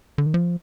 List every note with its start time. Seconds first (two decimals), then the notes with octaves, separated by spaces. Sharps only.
0.18 D3
0.26 D#3
0.34 F3